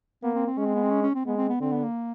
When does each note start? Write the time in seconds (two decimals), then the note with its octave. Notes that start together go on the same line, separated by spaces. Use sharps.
0.23 A#3 B3
0.35 C4
0.46 C4
0.57 G#3 C#4
0.65 C4
0.75 B3
0.83 C4
0.91 C#4
1.02 C#4
1.15 C4
1.26 G#3 B3
1.37 C4
1.49 B3
1.60 D3 C4
1.72 B3
1.83 A#3